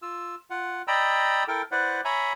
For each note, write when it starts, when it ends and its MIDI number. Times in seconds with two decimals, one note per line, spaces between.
0.02 0.35 65
0.02 0.35 88
0.50 0.82 65
0.50 0.82 78
0.88 1.44 74
0.88 1.44 75
0.88 1.44 79
0.88 1.44 82
0.88 1.44 83
0.88 1.44 88
1.48 1.62 64
1.48 1.62 69
1.48 1.62 70
1.48 1.62 79
1.71 2.01 64
1.71 2.01 71
1.71 2.01 72
1.71 2.01 74
1.71 2.01 78
2.05 2.33 73
2.05 2.33 76
2.05 2.33 80
2.05 2.33 82
2.05 2.33 83